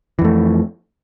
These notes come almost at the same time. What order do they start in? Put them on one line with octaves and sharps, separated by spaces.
E3 F2 A3